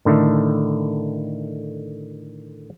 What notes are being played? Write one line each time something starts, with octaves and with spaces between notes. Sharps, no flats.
A2 D3 D#3 A3